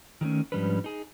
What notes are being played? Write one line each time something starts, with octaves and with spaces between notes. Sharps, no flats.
D#3 F#3 A3 C#4
G#2 F3 G3 C#4 D4 B4
D#4 G#4